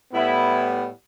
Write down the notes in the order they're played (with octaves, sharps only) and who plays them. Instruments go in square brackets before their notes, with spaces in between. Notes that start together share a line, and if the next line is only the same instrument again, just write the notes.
[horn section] A2 G3 B3 E4